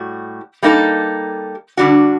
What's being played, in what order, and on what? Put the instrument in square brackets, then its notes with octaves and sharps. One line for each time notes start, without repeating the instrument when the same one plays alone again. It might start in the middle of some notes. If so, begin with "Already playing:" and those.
Already playing: [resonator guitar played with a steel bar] A2 G3 F#4
G3 A#3 D#4 A4
D3 G3 D4 F#4